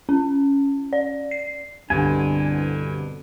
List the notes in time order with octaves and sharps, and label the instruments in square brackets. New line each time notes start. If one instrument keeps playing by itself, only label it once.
[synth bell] C#4
D5
C7
[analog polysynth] C2 B2 D3 [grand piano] G2 [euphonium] D4 [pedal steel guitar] G#5